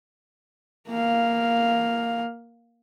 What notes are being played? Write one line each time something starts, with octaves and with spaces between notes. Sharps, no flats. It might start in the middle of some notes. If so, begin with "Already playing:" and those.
A#3 F5